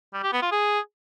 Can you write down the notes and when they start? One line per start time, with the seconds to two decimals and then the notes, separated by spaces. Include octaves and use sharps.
0.14 G3
0.23 G4
0.33 B3
0.42 F4
0.52 G#4